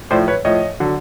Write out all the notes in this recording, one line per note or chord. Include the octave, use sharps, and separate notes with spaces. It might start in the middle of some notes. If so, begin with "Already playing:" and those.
A2 F3 C5 D5
B4 C#5
A2 F3 C#5 D#5
D3 F#3